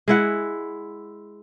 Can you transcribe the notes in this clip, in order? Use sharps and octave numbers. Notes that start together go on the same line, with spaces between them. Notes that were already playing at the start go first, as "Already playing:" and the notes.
G#3 E4 F#5